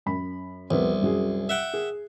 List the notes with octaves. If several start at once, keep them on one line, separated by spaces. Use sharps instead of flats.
F#2 B5
C2 F2 G3 B3
F#2 F#4 G#4
E5 F#5 G5
G#4